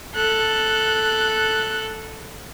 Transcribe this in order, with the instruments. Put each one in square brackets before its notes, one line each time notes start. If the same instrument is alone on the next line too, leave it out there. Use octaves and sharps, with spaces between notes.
[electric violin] A4 F#6